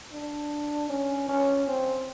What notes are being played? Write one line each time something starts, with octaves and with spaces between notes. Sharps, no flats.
D4
C#4
C#4
C4